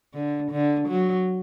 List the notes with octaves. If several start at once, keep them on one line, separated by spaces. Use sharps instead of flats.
D3
D3
F#3